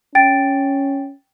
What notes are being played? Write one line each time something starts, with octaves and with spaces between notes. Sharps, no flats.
C#4 G5 A6 D7